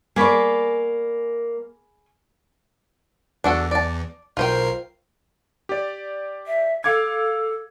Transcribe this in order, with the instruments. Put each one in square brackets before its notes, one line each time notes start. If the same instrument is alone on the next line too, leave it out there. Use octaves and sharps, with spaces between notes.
[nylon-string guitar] A#3 D5 [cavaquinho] G#4 B5 C#6
[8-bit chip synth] E2 [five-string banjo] D4 F#4 A4
[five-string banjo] D5 A5
[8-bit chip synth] B1 A#4 C7 [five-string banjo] F4 C5 G5
[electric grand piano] G4 D5
[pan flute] E5
[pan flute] A4 [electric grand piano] F5 D6 G#6